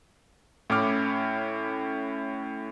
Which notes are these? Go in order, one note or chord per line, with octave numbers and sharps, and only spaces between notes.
A2 C#4 E4 D6 F6